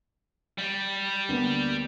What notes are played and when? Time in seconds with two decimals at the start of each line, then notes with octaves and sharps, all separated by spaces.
0.58 G3
1.29 D2 A#3 B3